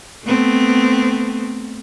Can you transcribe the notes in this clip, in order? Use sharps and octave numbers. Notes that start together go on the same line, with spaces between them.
A3 B3 C4